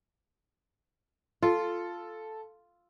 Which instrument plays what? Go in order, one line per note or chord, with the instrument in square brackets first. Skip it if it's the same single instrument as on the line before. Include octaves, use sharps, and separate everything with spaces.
[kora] F4 [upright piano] A4